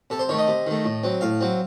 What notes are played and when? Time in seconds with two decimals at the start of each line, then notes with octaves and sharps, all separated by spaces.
0.10 C3 A4
0.19 C5
0.29 D#3 A3 C#5
0.39 D#5
0.48 C3
0.67 D#3 A3
0.85 A2
1.03 F#3 C4
1.21 A2 F5
1.41 F#3 C4